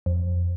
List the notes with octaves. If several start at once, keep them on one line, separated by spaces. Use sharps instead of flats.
F2